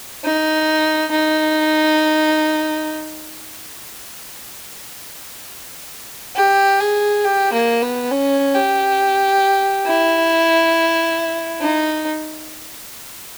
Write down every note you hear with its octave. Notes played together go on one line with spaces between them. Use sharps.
D#4
D#4
G4
G#4
G4
A#3
B3
C#4
G4
E4
D#4